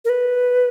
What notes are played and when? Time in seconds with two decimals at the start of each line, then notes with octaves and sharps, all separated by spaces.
0.05 A#4
0.09 B4